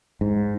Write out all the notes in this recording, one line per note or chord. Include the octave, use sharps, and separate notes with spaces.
G#2